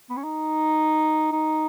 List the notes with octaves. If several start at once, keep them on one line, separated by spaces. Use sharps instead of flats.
B3
C#4
D#4
D#4